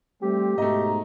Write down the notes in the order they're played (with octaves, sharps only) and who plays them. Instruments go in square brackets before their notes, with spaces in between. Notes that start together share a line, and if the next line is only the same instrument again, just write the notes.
[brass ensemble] G3 A3 C4 [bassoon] G4
[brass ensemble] G#2 B2 A#5 [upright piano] A3 D#5